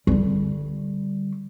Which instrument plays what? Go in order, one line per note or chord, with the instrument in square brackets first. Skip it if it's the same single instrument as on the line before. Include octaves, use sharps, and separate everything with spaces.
[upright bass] D3 G3